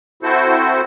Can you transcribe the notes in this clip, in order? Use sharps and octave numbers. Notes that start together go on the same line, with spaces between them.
C4 E4 F#4 A4 C5